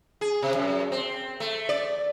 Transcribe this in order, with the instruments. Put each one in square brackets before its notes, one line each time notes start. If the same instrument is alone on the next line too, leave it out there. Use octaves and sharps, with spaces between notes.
[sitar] G#4
C3
F#2
C4
A3
D5